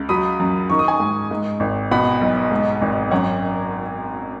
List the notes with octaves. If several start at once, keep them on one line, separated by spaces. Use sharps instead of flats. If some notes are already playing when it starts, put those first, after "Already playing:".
Already playing: C#2
F#3 B5 D#6
F#2
D#3 C#6
D#6
G#5 C#6
G#2
G#2
G#1
B2 F#5 B5
B1
G#2
G#1
F#2 C#5 F#5